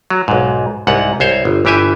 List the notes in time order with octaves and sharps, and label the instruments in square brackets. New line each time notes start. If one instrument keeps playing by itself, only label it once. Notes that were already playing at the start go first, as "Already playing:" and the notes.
[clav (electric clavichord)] F#3
B1 G#2
C2 G#2 F#5
C2 C5 C#5
G1
G1 E3 G4 E5 G#5